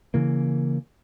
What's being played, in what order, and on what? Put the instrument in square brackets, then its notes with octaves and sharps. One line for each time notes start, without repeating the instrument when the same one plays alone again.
[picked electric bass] C#3 E3 A#3